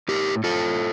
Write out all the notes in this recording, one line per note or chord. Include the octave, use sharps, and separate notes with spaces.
A2 G4 A#4
A2 F4 A4